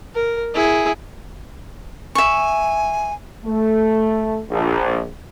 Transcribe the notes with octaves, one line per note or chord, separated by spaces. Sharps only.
A#4
E4 G#4
E5 G#5 C#6
A3
A#1